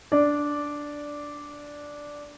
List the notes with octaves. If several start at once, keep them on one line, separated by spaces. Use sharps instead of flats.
D4 D5